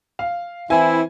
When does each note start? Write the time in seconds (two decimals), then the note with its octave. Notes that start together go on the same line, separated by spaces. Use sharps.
0.19 F5
0.70 E3 C4 E4 G#5